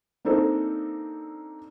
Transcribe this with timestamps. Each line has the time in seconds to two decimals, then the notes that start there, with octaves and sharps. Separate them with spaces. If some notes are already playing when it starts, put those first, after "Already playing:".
0.25 A#3 C4 D4 D#4 A4 C5